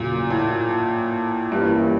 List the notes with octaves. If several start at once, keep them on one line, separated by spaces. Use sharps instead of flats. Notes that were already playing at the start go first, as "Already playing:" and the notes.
Already playing: E2 A#2 C#3 F#3
A2
G2 E3 G3 A#3 C#4 E4
G2